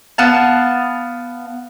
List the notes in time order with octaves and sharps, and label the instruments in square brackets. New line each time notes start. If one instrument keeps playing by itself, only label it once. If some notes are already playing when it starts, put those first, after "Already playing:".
[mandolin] B3 F5 A5